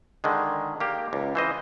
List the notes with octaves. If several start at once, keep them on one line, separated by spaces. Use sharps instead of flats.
D3 D#3 G#3
A#3 G4
C#2
E3 C5 D#5